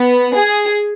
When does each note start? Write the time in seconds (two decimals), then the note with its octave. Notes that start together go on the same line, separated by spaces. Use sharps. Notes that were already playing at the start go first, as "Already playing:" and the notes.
Already playing: B3
0.36 G#4